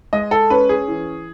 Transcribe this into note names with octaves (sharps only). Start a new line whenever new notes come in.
G#3 D#5
A4
C#4 B4
G#4
E3